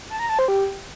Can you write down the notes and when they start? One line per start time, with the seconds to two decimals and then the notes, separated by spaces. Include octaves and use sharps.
0.10 A5
0.19 A#5
0.29 A5
0.39 C5
0.48 G4